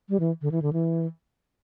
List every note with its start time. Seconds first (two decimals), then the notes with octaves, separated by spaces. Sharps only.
0.09 G3
0.20 E3
0.42 D3
0.52 E3
0.62 D3
0.73 E3